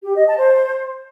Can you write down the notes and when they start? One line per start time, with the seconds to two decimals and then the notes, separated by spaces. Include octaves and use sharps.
0.03 G4
0.15 D#5
0.26 A5
0.37 C5